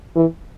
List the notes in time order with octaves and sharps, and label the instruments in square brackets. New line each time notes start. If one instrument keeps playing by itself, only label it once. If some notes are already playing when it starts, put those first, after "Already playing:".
[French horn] E3